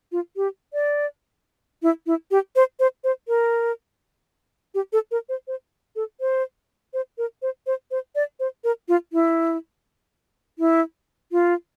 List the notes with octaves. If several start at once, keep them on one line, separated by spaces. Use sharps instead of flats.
F4
G4
D5
E4
E4
G4
C5
C5
C5
A#4
G4
A4
A#4
C5
C5
A4
C5
C5
A#4
C5
C5
C5
D5
C5
A#4
F4
E4
E4
F4